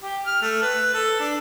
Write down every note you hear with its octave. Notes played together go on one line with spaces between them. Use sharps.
G4
F6
A3
B4
A4
D4